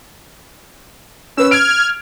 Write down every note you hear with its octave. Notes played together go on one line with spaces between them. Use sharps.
C#4 B4 E6
F6 G#6 D7